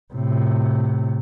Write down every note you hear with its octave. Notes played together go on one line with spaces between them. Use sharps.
A2 C3